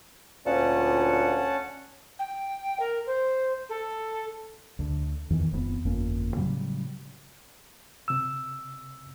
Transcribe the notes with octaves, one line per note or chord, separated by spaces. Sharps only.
D2 A#2 C#4 F#5 A5
G5
A#4
C5
A4
D2 D3
E2 D#3 E3
D#1 F2 E3 B3
G1 F2 A#3 C#4
A2 C#3 F#3 G3
C3 E6